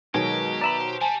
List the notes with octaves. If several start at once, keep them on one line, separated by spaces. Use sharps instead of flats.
B2 D#3 F#3 G#3 G4 G#4 A#4
D5 E5 A#5 B5 E7
C5
G3 G#5 A5